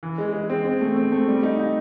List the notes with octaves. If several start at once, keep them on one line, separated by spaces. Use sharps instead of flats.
E3
G#3
G#3
C4
C4
A3
C4
A3
G3
D#4
D#4